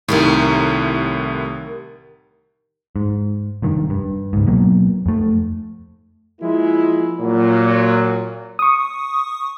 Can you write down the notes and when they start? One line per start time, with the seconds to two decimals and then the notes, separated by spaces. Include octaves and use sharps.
0.08 C2 A2 D#3 G4 A#4
2.96 G#2
3.62 F1 G2 D#3
3.90 G2
4.33 C#2 G#2
4.48 B2 F#3 A#3
5.06 F2 A3
6.40 F3 G#3 A#3 E4
7.20 A#2 F#3
8.59 C#6 D#6